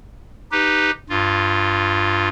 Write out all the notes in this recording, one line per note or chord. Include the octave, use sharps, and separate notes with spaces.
D#4 G4 B4
G2 F4